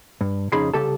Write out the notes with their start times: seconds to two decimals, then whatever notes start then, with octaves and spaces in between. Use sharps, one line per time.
0.21 G2
0.52 F2 C#3 D#4 G#4 B5 C6
0.74 C2 C#3 G4 A4 A5